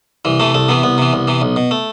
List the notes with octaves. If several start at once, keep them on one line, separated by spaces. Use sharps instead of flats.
C2 E3
C3 E3 A3
C2 A3
C3 E3 B3
C2 B3
C3 E3
C2
C3 E3
B1
B2
A3